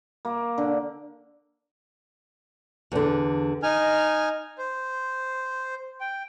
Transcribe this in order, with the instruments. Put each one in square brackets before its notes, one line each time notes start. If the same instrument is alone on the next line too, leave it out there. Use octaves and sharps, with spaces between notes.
[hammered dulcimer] A#3
D3
[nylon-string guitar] E2 D3
[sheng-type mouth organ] D#4 G#5 F6
C5
G5